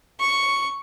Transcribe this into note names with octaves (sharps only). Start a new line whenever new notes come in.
C#6